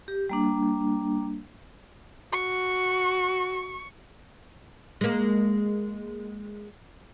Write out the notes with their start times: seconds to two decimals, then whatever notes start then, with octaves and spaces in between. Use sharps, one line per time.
0.08 G4
0.29 G3 A#3 D4
2.33 F#4 C#6
5.01 G#3 A#3